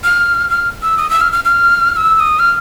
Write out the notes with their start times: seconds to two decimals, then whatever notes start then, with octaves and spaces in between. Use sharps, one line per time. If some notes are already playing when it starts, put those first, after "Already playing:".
0.04 F6
0.50 F6
0.82 E6
0.97 D#6
1.10 E6
1.21 F6
1.33 F6
1.45 F6
1.92 F6
1.97 E6
2.15 E6
2.20 D#6
2.39 F6